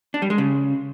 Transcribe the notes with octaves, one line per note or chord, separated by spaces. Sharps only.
D4
G3
G#3
C#3